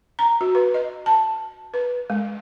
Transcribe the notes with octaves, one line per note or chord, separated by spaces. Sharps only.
A#5
F#4
B4
D#5
A5
B4
G#3